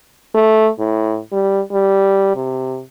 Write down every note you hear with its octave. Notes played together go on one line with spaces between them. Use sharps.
A3
A2
G3
G3
C3